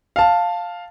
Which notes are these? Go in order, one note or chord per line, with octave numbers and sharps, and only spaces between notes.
F5 A5